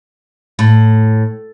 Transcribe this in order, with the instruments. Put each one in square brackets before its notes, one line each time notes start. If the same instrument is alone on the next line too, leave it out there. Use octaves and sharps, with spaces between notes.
[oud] A2